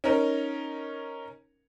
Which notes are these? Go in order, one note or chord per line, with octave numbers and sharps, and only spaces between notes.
C#4 D#4 A#4